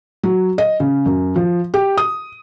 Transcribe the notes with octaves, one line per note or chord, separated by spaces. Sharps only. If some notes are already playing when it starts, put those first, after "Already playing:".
F#3
D#5
C#3
F#2
F3
G4
D#6